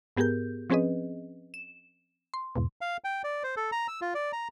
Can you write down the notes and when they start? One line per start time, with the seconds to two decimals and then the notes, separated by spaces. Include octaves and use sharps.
0.17 G#2 B3 G4 G#4 A#4 G6
0.70 F3 C4 C#4 G#4 B4 D#5
1.54 E7
2.34 C6
2.56 E2 G#2 B2
2.81 F5
3.04 G5
3.24 D5
3.43 C5
3.57 A4
3.72 A#5
3.88 E6
4.01 F4
4.14 D5
4.33 A#5